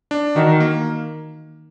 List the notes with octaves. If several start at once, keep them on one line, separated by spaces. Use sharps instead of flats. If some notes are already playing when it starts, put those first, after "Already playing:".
D4
D#3 F#4
A#3